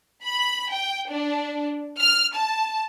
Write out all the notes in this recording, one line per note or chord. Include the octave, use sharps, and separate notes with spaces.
B5
G5
D4
F6
A5